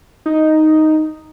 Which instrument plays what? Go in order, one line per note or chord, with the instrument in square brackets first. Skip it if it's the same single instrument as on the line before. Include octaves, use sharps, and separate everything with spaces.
[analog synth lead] D#4